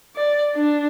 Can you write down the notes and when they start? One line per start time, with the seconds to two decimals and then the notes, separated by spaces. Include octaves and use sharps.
0.16 D5
0.55 D4